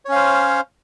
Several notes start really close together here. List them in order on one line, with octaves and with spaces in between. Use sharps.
C#5 C#4 F5 C5